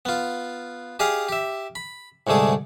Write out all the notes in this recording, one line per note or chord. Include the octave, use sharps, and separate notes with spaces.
B3 F4
G4 G#4 D#5 F5
G4 E5
B5
C2 G#2 D3 A3 G#4